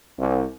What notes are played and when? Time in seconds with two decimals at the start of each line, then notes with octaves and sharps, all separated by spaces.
0.18 C2